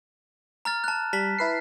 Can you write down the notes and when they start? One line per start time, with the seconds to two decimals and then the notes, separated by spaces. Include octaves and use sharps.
0.65 A#5 F6 A6
0.84 A5 F#6
1.13 G3 A5 B6
1.38 E4 B4 C7